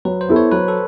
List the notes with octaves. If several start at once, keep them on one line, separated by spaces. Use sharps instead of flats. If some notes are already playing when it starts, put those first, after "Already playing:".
F#3 B4
C5
B3 E4 A4
C#5
F#3 B4
A4